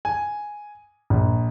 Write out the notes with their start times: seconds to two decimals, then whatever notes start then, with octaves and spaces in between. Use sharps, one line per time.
0.05 G#5
1.10 A#1